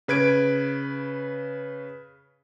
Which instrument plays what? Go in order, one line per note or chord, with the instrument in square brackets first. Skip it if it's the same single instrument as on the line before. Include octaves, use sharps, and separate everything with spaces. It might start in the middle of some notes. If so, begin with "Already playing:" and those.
[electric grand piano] C#3 B4 G#6 D7